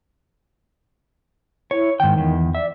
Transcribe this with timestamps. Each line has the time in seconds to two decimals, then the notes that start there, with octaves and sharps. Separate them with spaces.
1.71 E4 C#5
2.00 G#2 D#3 G5
2.18 E2
2.55 D5 E5